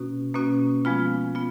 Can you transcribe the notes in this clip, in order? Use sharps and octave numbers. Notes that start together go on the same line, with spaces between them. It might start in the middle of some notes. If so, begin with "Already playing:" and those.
Already playing: B2 A#3 C#4 F#4
B2 A#3 C#4 F#4
F3 G#3 B3 F4
B3 F4